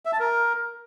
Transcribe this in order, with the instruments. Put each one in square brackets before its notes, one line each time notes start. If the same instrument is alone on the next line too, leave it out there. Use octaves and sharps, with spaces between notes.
[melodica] E5
A5
A#4